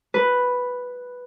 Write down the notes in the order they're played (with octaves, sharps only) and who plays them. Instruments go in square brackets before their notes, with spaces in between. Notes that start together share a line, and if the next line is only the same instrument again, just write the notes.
[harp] B4